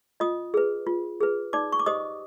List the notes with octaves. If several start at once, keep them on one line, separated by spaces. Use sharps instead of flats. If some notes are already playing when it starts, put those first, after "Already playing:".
F4 D#5 D#6
G#4 B4
F4
G#4 B4
D#4 D5 D6
C#6
D6
G4 C5 D#5 D#6